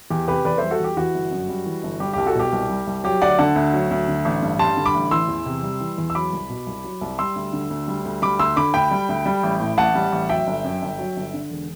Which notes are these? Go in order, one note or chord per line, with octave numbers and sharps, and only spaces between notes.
E2 G4
C3 G4 B4
E2 B4 D5
G3 C5 E5
F#4 A4
E2 G4
E3 F#4
G1
F#2
G3
E3
G1
G3 G4
C2 G4
F#4 A4
B2 G4
C2
G3
C2
F#3 G4
D2 D5 F#5
D3 F#5 A5
D2
F#3
D2
D3
A1
G2
G3 A5 C6
D3
B5 D6
A1
E3 C6 E6
E2
C3
G3
E3
E2
E6
F#3 B5 D6
C2
B2
C2
F#3
C2
G3 C6 E6
D2
D3
D2
G3
D2
G3 B5 D6
D2 C6 E6
D3 B5 D6
D2 G5 B5
G3
D2
G3
A1
A2
A1 F#5 A5
G3
A1
F#3 E5 G5
G1
F#2
G1
F#3
G1
D3
E1